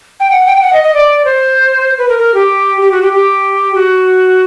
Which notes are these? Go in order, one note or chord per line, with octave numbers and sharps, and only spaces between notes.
G5
F#5
G5
G5
F#5
D#5
D#5
D5
C5
B4
A#4
A#4
G4
G4
F#4
G4
G4
F#4